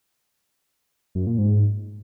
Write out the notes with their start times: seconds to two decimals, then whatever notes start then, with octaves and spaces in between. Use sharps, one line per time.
1.15 F#2
1.27 A#2
1.38 G#2